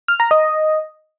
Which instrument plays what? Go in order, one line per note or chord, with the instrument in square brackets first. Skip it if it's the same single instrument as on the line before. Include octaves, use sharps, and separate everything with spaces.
[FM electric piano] F6
A#5
D#5